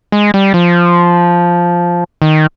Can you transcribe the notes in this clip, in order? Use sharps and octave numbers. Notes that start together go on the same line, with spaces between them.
G#3
G3
F3
D#3